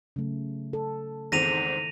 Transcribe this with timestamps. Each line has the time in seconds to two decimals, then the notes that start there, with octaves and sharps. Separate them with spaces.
0.16 C#3 F#3 A3
0.73 A4
1.32 E2 G#2 D#3 C4 A4 A#6 D#7 F7